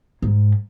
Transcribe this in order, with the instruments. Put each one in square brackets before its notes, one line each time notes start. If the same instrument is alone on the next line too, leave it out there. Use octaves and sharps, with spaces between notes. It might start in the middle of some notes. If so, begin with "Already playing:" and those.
[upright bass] G#2